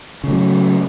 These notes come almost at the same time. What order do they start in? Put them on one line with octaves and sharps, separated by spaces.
C#3 A3 F#3